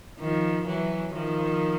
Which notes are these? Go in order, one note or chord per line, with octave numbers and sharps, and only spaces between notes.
D#3 F3
E3 F#3
D#3 F3